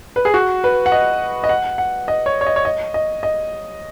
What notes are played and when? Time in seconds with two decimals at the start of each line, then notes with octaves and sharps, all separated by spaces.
0.16 B4
0.25 G#4
0.34 F#4
0.64 B4
0.86 F#5
0.92 D#5
1.44 D#5
1.49 F#5
1.78 F#5
2.08 D#5
2.26 C#5
2.41 C#5
2.46 D#5
2.56 C#5
2.65 D#5
2.94 D#5
3.23 D#5